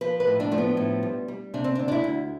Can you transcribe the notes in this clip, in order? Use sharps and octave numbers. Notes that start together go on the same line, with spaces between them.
F3 B4
B4
A2
D4
F3 A3
B3
A2
G3
G3
C3 D4
C4
D4
D2
D4
E4
D2